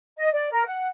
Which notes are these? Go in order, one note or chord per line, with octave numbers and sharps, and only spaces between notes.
D#5
D5
A#4
F#5